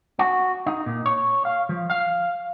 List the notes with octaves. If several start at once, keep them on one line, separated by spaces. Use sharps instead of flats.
F#4
D#4
A#2
C#5
F5
F3
F5